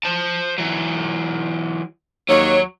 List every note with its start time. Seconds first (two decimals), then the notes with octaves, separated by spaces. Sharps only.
0.03 C5 A5
0.58 E3 F#3
2.29 D#2 F#3 C#5